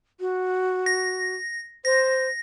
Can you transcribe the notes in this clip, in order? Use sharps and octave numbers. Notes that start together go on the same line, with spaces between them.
F#4
A#6
C5 A#6